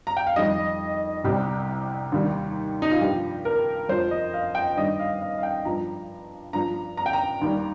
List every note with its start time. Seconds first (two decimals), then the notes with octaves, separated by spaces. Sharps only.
0.07 A#5
0.17 G5
0.27 F5
0.36 F2 D#3 G3 D#5
1.24 C2 C3 G3 G4
2.12 D#2 D#3 G3
2.82 D#4
2.91 F4
3.01 G2 F3 G4
3.45 A#4
3.89 F2 F3 C5
4.11 D#5
4.33 F5
4.55 G5
4.77 G2 D#3 G3 D#5
4.99 F5
5.21 F5
5.38 F5
5.43 G5
5.65 G2 F3 A#5
6.53 G2 F3 A#5
6.97 A#5
7.06 G5
7.13 A#5
7.42 D#2 D#3 G3